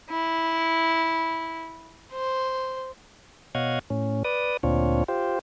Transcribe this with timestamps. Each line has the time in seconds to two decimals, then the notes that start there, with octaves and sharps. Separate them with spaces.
0.10 E4
2.13 C5
3.55 B2 C#5 D#5 F5 F#5 G#6
3.90 A2 C#4
4.24 B4 D5 D#6
4.63 D2 A#2 C4 D4 F4 C#5
5.08 F4 G4 C5